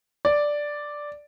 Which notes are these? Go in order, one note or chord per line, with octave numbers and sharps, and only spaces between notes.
D5